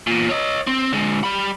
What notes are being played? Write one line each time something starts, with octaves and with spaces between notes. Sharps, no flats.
E2 A#2
C#5 D#5
C4
D3 G#3
G3 B5